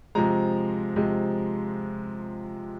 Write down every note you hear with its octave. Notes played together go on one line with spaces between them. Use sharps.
C3 F3 G#3 A#5
C3 F3 G#3